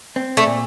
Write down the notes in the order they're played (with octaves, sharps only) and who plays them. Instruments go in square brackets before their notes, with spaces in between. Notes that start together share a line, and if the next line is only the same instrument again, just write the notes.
[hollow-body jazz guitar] C4
[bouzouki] A3
[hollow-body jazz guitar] A#2